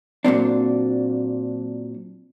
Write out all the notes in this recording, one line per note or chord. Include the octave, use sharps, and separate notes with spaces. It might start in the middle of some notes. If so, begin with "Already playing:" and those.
A#2 F#3 C4 D4